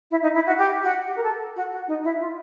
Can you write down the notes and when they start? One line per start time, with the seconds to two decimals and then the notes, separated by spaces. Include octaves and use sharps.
0.11 E4
0.22 D#4
0.34 E4
0.46 F#4
0.58 G4
0.83 F#4
1.07 G4
1.16 A#4
1.23 A4
1.56 F#4
1.72 F#4
1.87 D#4
2.04 E4
2.19 F4